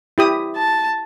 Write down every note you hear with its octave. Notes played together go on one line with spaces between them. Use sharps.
E4 G4 D#6
A5